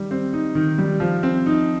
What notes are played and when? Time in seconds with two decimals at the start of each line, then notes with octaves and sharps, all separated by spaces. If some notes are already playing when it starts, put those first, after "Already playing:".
Already playing: D#3 G3
0.11 C4
0.33 D#4
0.55 D#3
0.78 G3
1.00 F3
1.23 C4
1.46 D#4